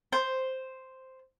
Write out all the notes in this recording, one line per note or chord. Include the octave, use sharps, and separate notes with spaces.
C5